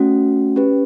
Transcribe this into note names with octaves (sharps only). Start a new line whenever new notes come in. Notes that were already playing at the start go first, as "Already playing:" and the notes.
Already playing: A3 C#4 F#4
C#4 G4 B4